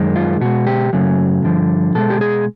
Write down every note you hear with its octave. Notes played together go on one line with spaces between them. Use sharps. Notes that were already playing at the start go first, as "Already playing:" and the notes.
Already playing: F#2 D#3 G#3
F4
B2 G#3 F#4
G4
F#2 C#3 F#3 A3
G2 D3 F3
B2 G#3 A4
G4
G#4